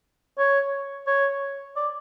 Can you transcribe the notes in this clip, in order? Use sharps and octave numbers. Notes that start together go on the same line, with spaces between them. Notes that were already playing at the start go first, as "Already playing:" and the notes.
C#5
C#5
D5